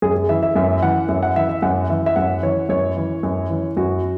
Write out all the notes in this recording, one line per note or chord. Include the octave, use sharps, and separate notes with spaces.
F#2 G#4
G#4
E3 E5
E5
F#2 E5
E3 F#5
F#2 E5
F#5
E3 E5
E5
F#2 F#5
E3 E5
E5
F#2 F#5
E3 C#5
F#2 C#5
E3
F#2
E3
F#2 F#4